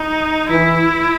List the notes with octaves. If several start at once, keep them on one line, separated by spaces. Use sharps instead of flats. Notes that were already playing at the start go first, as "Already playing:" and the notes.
Already playing: D#4
E3 E4